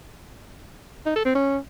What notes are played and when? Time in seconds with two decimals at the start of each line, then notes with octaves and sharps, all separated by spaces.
1.06 D#4
1.16 A4
1.25 C4
1.35 C#4